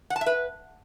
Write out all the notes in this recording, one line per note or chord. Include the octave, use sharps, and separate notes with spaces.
F#5
A5
E5
B4